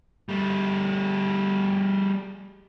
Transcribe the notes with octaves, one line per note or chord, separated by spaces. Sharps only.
G3 A3